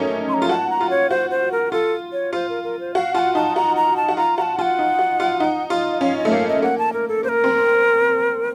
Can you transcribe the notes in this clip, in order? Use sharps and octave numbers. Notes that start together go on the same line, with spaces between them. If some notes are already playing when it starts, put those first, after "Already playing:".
Already playing: F#3 A3 A#3 C#4 D#4
C6
A#5
F4
F#4 A5
A#5
F4
C#5
F#4 C5
C5
A#4
F4 A4
C#5
F4 C5
A#4
A#4
C5
F#4 F5
F4 F#5 A5
D#4 A5
F#4 A#5
A#5
A5
F#4
F4 A#5
F#4 A5 A#5
F4 F#5 A5
D#4
F#4
F4
D#4
F4
D#5
C#4 F5
D#5
A3
A#3 F5
D#5
A#3 F#5
A5
A#4
A4
A#3 C5
A#4
C4